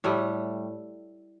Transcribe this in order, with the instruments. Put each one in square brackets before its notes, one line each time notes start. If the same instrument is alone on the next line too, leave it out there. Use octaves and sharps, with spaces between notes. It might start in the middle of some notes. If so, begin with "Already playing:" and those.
[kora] A2 G3 A3